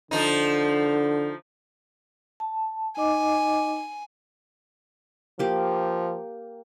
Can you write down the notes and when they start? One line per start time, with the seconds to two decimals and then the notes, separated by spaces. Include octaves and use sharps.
0.11 D3 F3 D#4
2.40 A5
2.97 D#4 D#5 G#5 D6
5.39 F3 A#3 G4